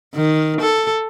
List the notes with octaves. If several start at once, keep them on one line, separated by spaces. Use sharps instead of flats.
D#3
A4